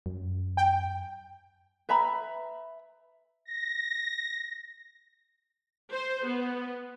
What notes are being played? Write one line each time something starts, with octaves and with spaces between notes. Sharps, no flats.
F#2
G5
B4 E5 A#5 B5
A#6
C5
B3